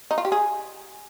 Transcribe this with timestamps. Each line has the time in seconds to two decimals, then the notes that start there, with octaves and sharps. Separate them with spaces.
0.11 D#4
0.18 F4
0.25 G4
0.32 G#4